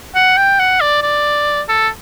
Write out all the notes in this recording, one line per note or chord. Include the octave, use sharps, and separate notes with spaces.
F#5
G5
F#5
D5
D5
A4